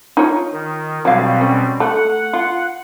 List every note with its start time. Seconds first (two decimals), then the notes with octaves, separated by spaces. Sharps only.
0.17 D#4 F4 C#5
0.53 D#3
1.05 B2 F#3 G3 C4 F5
1.41 C#4
1.80 A3 F#5
2.33 F4